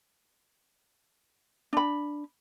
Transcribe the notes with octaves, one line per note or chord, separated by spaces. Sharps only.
D4 B5